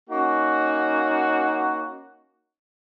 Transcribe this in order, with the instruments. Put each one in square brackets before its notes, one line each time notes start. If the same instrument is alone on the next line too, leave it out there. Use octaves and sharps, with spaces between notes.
[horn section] A#3 C#4 D#4 F#4